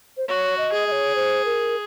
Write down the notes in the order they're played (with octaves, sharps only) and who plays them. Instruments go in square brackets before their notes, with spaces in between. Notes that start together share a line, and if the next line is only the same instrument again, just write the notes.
[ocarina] C5
[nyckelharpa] F#4 [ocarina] C#5
[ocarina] D#5
[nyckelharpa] G#4
[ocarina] D#5
C#5
C5
A#4